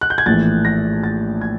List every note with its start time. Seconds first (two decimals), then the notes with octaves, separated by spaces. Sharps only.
0.01 F#6
0.10 G6
0.18 G#6
0.26 A#1 A2 E3 A6
0.65 A#6
1.04 A6
1.41 G#6